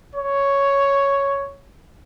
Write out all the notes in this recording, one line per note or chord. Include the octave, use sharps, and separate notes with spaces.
C#5